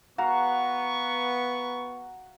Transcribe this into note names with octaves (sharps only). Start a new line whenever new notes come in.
B3 F#4 F5 A#5 C#6